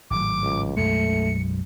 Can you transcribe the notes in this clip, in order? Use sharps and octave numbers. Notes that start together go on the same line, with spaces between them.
G#1 A2 F#3 D6
C#2
B1 F#2 G#3 A3 C#7